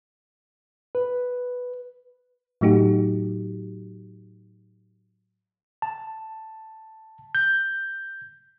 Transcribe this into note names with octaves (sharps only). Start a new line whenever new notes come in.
B4
A2 F#3 A3 D#4 F#4 G4
A5
G6